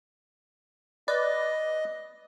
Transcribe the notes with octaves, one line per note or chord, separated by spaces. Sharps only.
B4 D5 D#5